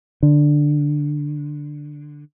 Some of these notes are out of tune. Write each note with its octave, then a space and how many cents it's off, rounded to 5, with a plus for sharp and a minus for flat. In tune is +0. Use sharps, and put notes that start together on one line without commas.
D3 +5